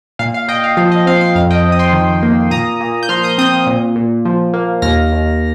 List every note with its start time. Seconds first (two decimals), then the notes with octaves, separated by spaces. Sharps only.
0.19 A#2 F5
0.34 F5
0.48 A#2 D#5 G5
0.64 F5
0.77 F3 F5
0.92 D#5
1.06 C4 F5
1.21 F5
1.35 F2 F5
1.51 D#5 G5
1.64 F2
1.72 D#6
1.79 G5 C6
1.93 D#3
2.23 A#3
2.51 A#2 A#5 D#6
2.81 A#2
3.03 G6
3.09 F3 C6 F6
3.23 D#6 G6
3.38 C4 D#6 G6
3.66 A#2
3.96 A#2
4.25 F3
4.54 A#3
4.82 D#2 F6 A#6
5.12 D#2